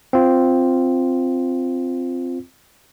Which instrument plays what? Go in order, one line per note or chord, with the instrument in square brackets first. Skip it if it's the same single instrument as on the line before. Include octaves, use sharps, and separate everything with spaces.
[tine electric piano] C4 F4